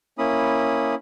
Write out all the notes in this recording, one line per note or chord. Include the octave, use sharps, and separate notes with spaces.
A#3 C#4 E4 B5 D#6